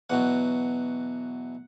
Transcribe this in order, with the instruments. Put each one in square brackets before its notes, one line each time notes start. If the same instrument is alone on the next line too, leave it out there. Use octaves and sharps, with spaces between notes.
[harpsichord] E2 B2 F#3 F#5